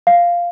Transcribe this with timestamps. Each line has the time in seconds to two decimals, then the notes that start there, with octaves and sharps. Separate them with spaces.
0.07 F5